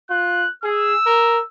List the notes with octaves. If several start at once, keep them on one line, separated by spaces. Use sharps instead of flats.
F4 F#6
G#4 E6
A#4